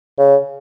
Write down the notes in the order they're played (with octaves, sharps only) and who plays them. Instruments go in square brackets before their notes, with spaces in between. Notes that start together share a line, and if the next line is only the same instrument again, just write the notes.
[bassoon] C#3